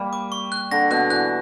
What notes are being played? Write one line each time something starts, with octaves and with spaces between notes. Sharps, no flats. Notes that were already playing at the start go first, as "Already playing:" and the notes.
Already playing: G3 A#3
D6
C#6
F#6
D3 A#6
B2 F#6
E3 F#6